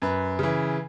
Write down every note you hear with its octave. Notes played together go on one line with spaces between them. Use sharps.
F#2 B4
C#3 E3